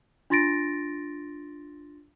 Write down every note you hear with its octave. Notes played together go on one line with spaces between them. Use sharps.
D4 F4 C6 A6 A#6 D7